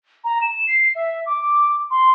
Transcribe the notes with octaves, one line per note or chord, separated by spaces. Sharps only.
A#5
E7
C7
E5
D6
C6